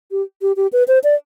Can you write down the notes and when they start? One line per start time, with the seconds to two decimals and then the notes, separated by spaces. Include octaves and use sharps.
0.11 G4
0.42 G4
0.56 G4
0.73 B4
0.88 C5
1.04 D5